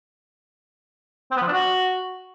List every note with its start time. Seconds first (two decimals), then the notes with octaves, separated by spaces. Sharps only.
1.31 C4
1.37 B3
1.42 F3
1.47 D4
1.53 F#4